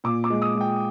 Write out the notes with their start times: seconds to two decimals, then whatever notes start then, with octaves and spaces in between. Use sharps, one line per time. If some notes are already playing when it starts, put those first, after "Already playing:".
0.04 A#2 D6
0.24 D6
0.30 G#3
0.42 D#6
0.55 G#3
0.61 G5